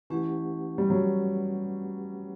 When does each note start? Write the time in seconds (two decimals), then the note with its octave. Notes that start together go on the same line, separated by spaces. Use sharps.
0.10 E3 A3 C#4 G4 B4 F#5
0.78 G3
0.90 F#3